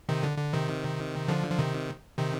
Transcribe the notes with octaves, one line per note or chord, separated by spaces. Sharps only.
C3 D#3
D3
D3
C3 D#3
D3 F3
F3
C3 D#3
C3 D#3